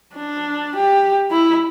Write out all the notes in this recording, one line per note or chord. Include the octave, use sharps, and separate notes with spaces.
D4
G4
E4